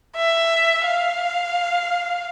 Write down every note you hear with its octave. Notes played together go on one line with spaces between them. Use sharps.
E5
F5